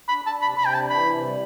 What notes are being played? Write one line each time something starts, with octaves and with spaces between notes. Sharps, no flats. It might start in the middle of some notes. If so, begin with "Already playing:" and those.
D4 B5
D4 A5
C3 B5
C3 B5
G5
D4 A5
E3 B5
C3
G3